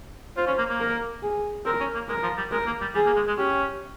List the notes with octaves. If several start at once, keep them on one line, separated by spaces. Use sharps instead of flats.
F4 C5
C#4
A#3
A#3
A#4
G#4
C4 A#4
C#4
A#3
G#3 A#4
F3
G3
G#3 A#4
A#3
G3
G3 G#4
A#3
G#3
G#3
C#4 G4